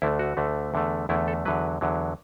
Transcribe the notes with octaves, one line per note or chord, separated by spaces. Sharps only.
D2 D3 A3 E4
F#4
D2 D3 A3
E2 D3 A3
E2 D3 A3 E4
A4
E2 D3 F#3 B4
E2 D3 F#3